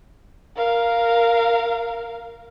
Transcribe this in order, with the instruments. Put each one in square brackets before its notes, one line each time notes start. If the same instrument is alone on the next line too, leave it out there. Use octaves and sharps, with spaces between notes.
[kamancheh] A#4 F5